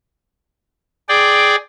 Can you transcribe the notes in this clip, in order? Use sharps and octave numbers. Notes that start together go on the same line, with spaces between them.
G#4 D5 G5